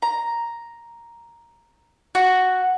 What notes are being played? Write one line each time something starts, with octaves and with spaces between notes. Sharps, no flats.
A#5
F#4